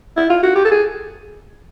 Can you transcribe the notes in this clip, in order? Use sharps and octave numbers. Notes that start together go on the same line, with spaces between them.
E4
F4
F#4
G4
A4
G#4